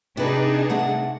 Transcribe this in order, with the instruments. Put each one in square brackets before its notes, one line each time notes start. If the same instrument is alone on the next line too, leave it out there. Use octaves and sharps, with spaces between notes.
[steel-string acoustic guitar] C3 B4 [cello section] D4 D#4 G#4
[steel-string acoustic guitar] C3 A3 F#5